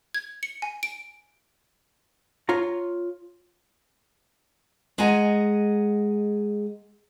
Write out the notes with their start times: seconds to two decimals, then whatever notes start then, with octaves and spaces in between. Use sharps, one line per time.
0.14 G#6
0.43 C#7
0.62 G#5
0.83 D7
2.49 F4 C#5 A#5
4.98 G#3 G#4 D#5 F#5 G#5 A#5